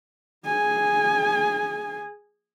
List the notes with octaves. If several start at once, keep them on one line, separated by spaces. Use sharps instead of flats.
G#4 G#5